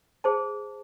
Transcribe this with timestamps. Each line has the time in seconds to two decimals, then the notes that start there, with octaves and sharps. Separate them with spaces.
0.24 G#4 C5 A5